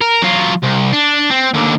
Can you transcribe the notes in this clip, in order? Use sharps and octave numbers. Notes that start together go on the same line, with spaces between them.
A#4
F#3 F4
C2
D4
C4
D#2 D3